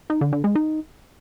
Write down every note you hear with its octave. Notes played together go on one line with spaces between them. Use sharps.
D#4
D3
D3
G#3
D#4